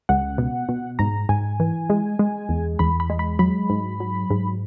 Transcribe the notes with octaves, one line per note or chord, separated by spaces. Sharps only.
C#2 F#5
B2
B2
G#2 A#5
G#2 G#5
E3
G#3
G#3
E2
E2 B5
B5
G#3
B5
F#3 B5
G#2
F#3
G#2